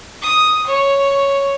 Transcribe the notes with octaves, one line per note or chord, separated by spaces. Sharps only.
D#6
C#5